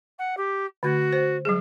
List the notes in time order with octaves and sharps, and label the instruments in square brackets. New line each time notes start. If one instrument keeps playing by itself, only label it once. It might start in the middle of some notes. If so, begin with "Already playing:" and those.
[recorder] F#5
G4
[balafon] D3 A3 [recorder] F#4
[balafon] C5
F#3 G3 G#4